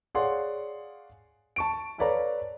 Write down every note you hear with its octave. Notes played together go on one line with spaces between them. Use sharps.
G#4 C#5 D5 F5 F#5 C6
A5 C#6 D7
A4 B4 C#5 D5 F5 A#5